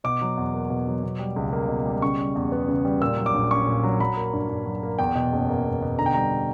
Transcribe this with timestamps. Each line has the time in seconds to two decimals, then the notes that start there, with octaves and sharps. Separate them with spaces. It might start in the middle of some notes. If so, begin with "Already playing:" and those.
0.04 B2 D6
0.21 F#3
0.37 E2
0.54 A#3
0.70 B2
0.87 F#3
1.03 B2
1.19 G3
1.36 C#2
1.53 A#3
1.69 B2
1.85 G3
2.02 C#3 C#6
2.19 G3
2.36 E2
2.52 B3
2.68 C#3
2.85 G3
3.01 A#2 E6
3.17 F#3
3.26 D6
3.34 A#1
3.51 C#4 C#6
3.68 A#2
3.83 F#3
4.00 F#3 B5
4.17 A#3
4.33 G2
4.49 G2
4.66 F#3
4.83 A#3
4.99 E2 G5
5.15 B2
5.32 F#1
5.49 A#3
5.65 E2
5.82 B2
5.98 D3 A#5
6.06 G5
6.14 G3 A#5